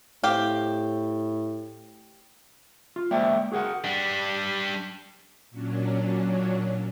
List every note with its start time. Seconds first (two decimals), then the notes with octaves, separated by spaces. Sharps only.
0.23 A2 C4 G4 F5
2.96 F4
3.11 G#3 A#3 C5 D5 E5 G5
3.52 F#4 G#4 A#4 F5 F#5
3.84 G3 D4
5.50 A#2 F#3 C#4 D4